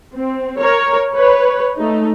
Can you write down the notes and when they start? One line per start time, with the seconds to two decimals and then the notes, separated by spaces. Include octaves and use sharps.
0.15 C4
0.59 A#4 C#5
1.13 B4 C#5
1.76 A3 D#4